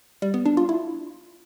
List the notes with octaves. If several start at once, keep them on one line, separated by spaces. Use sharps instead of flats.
G3
B3
D4
F4
E4